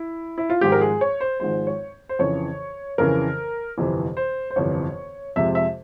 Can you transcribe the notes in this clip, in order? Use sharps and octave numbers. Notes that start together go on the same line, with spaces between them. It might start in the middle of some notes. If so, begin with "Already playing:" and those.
Already playing: E4
E4
F4
G#1 G#2 F3 G#3 G4
A#4
G#4
C#5
C5
G#1 G#2 F3 G#3 C5
C#5
C5
F2 C#3 E3 C#5
F2 C#3 E3 A#4
G1 F2 C3 E3
C5
C5
G1 F2 C3 E3 C#5
F2 C3 F3 G#3 E5
E5